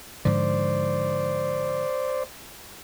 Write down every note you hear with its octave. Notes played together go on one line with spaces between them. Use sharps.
G#2 D3 F3 C5 D5